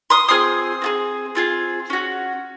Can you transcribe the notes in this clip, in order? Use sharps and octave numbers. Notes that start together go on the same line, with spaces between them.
C6 D#6
C4 F4 G#4 C6 D#6
C4 F4 G#4
C4 F4 G#4
C#4 F#4